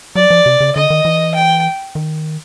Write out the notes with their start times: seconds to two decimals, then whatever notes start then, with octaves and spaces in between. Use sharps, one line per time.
0.15 F#3 D5
0.30 F3
0.46 C3
0.60 C#3
0.76 D3 D#5
0.90 D#3
1.05 E3
1.35 G5
1.95 D#3